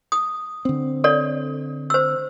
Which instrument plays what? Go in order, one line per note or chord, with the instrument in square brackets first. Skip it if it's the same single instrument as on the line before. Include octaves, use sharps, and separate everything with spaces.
[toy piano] D#6
[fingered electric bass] D3 C4
[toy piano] A4 C#5 D5
C5 E6